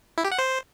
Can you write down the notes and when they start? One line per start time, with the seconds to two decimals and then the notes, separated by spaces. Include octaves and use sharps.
0.18 E4
0.25 G4
0.32 F#5
0.38 C5